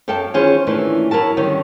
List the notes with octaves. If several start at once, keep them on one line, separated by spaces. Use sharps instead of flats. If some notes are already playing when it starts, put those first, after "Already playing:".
F#2 A4 F5 G5 A5
D#3 E3 C#4 F4 G#4 C5
A#2 D#3 E3 A3 C#4 D4
F#3 E4 A#4 A5
D3 D#3 G3 C#4